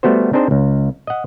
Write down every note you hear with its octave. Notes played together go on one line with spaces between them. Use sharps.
G3 A3 B3 F#4 C5
C4 D4 D#4 G#4 C5
C#2
D#5 F#5